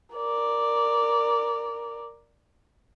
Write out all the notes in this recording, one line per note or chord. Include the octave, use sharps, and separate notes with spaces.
A#4 D5